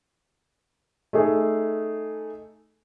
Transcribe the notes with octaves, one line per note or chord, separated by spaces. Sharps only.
A3 D#4 G#4